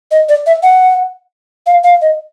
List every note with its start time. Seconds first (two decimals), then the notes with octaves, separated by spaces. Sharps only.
0.11 D#5
0.29 D5
0.46 E5
0.63 F#5
1.66 F5
1.84 F5
2.02 D#5